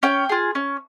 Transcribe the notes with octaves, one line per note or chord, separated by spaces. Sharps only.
C#4 G5
F4 G#4
C#4